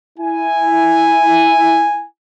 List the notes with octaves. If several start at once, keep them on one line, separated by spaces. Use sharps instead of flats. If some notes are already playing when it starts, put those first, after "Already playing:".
E4 G#5